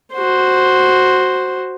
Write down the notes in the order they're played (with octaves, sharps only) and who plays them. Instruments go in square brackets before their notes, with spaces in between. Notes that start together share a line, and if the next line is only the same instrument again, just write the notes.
[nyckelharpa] F#4 C5